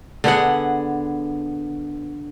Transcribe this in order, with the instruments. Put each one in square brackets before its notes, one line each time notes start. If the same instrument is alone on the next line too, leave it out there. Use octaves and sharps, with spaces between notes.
[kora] D3 B3 G#4 F#5